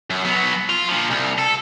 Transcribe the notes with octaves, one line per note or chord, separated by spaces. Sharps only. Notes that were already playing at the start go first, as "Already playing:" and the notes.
F#2
F#3 B3
F4
A#2 F3
C2
A4